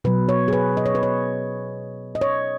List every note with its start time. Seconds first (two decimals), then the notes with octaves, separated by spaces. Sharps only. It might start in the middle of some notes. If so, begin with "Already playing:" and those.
0.04 B2 F#3 B4
0.29 C#5
0.48 G#4
0.53 B4
0.77 D#5
0.86 C#5
0.95 B4
1.03 C#5
2.15 D#5
2.21 C#5